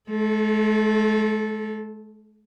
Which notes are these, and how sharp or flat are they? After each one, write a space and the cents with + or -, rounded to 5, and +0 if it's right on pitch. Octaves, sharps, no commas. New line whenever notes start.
G#3 +45 A4 -10